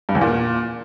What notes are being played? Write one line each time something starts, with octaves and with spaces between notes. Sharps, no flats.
G2
E2
A#2